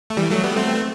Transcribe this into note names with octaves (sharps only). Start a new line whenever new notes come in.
A3
E3 G3
F#3 A3
G3 B3
A3 C4